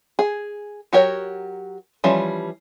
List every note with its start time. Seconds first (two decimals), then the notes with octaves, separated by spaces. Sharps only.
0.19 G#4
0.93 F#3 F#4 G4 A#4 C#5
2.04 E3 F3 G3 C#4